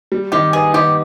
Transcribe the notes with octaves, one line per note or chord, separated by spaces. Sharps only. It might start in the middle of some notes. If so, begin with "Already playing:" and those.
G3
D#3 G4
B3 G#4
D#3 G4